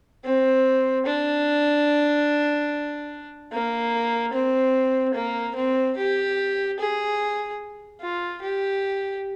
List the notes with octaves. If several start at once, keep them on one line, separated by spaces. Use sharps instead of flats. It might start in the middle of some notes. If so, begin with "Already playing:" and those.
C4
D4
A#3
C4
A#3
C4
G4
G#4
F4
G4